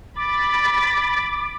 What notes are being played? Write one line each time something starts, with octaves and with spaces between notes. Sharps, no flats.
B5 D6 A6